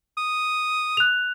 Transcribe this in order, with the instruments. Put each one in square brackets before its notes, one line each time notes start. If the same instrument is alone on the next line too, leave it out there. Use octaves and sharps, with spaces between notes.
[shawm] D#6
[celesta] F#6 F7